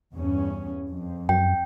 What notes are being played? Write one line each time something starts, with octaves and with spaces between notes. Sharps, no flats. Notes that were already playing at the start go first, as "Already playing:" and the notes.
E2 G2 C#4
F2
F#2 G5